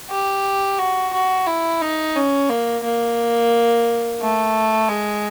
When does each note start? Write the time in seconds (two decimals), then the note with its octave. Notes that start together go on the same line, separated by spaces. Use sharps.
0.10 G4
0.78 F#4
1.13 F#4
1.47 E4
1.81 D#4
2.16 C#4
2.49 A#3
2.84 A#3
4.22 A3
4.89 G#3